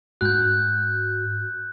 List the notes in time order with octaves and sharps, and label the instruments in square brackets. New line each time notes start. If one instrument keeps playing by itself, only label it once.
[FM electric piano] G#2 F#4 [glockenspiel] F#6 G6